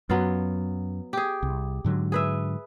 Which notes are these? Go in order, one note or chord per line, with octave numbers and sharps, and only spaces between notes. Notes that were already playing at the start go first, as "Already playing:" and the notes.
F#2 F#3 B3 F4
G4 G#4
C2
G#2 D3 F#3
G#4 B4 E5